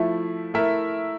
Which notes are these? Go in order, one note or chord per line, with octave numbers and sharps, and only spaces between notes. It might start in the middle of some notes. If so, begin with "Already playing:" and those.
Already playing: F3 A3 E4
A3 E4 A#4 E5